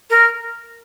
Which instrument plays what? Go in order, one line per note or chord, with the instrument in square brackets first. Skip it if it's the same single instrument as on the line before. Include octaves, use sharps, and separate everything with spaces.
[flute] A#4